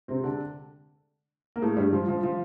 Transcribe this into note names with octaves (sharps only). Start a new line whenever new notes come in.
C3 C4
D3 D4
A#3
A2 A3
G2 G3
F3
F3
F3